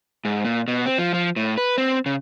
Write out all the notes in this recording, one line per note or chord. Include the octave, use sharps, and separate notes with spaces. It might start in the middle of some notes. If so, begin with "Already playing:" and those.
G#2
A#2
B2
C4
F3
F3
A2
B4
C4
C#3